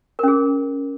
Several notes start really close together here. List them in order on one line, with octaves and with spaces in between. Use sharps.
A#4 C#4 G#4